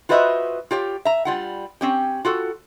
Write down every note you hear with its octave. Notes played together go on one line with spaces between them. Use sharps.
F4 F#4 B4 C5 D#5 E5
F4 G4 C#5
E5 A#5
G3 F4 F#5
C4 C#4 G4
F4 F#4 A4